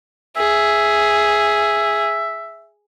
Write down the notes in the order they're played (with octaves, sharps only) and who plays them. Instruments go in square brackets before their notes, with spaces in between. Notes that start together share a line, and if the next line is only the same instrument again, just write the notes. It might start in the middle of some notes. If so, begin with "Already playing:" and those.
[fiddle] G#4 [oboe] E5